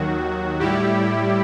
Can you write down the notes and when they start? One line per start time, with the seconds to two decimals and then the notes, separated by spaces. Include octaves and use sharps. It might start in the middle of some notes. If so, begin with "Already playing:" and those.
Already playing: D#2 D#3 F#3 F#4
0.60 A2 G3 E4 G4